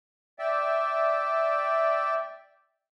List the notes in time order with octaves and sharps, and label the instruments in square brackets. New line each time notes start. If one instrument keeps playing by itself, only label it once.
[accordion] D5 E5 G5